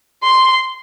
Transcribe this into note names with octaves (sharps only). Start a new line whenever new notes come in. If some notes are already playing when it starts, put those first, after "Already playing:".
C6